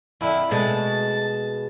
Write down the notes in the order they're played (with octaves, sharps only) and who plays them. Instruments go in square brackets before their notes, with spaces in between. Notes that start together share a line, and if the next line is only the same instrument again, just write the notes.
[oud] F2 D3 [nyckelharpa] E4
[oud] B2 G#3 A3 [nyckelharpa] A5